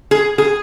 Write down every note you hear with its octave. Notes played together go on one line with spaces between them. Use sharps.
G#4
G#4